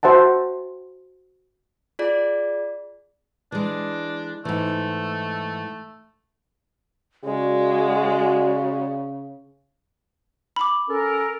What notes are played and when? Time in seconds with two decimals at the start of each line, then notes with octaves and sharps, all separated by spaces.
0.03 F#4 C5 E5 F#5 A5
1.99 F4 G#4 D5
3.52 E3 G#3 D4
4.45 G#2 E3 A3
7.25 C#3 G#3 F#4 D5
10.56 B5 D6
10.88 C#4 A4 A#4